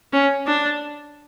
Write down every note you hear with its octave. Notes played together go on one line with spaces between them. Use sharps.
C#4
D4